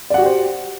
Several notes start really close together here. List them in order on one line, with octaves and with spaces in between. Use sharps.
D5 F#5 F#4 G4 C5